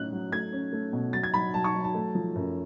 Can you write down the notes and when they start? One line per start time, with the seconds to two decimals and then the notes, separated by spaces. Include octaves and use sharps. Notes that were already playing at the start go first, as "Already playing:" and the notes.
Already playing: A2 F#3 C#4 F#6
0.12 F#3
0.32 A3 G#6
0.53 C#4
0.73 A3
0.93 B2
1.13 F#3 A6
1.23 G#6
1.34 F#3 B5
1.54 F#3 A5
1.64 C#6
1.74 F#3
1.84 A5
1.95 A3
2.15 F3
2.35 F#2